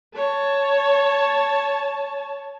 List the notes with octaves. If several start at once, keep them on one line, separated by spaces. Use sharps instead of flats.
C#5 A5